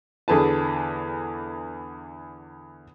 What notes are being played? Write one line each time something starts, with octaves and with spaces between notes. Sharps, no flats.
E2 D3 G#4 B4 A5